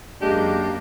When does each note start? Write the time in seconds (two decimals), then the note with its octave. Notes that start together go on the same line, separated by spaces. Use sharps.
0.21 F#2 G#3 A#3 D4 G4